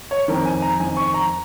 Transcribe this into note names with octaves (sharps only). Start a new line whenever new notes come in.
C#5
F2 D#3 A#4
G#5
A#5
F2 D#3 G#5
C#6
A#5